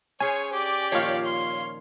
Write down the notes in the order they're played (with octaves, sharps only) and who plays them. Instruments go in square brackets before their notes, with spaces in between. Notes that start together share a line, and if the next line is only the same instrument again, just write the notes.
[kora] C#4 G#4 C5 [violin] C#5 [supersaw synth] G#5
[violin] G4 D5
[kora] A#2 D#3 F3 [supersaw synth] C#5 F5
[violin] C6